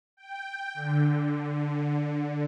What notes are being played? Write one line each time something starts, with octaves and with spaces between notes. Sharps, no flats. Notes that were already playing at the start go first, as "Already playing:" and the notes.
G5
D3